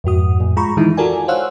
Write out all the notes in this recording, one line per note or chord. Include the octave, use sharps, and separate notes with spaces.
F2 G#2 F#4 D#6
F2 A2
G#3 F4 A#5 B5 C#6
D#3 E3 G#3 D#4 E4
F4 F#4 A4 A#4 D5 G#5
C5 C#5 F5 F#5 E6 F#6